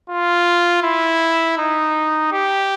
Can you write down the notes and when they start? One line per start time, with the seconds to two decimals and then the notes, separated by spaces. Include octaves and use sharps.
0.10 F4
0.83 E4
1.58 D#4
2.32 G4